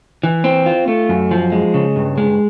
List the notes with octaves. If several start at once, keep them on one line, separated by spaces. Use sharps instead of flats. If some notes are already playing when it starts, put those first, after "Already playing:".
E3
C4
F4
A3
F#2
F3
G#3
C#3
G2
G#3